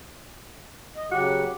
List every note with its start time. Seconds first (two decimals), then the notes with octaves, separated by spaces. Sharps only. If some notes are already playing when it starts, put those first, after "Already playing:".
0.96 D#5
1.11 C#3 F#3 F#4 G4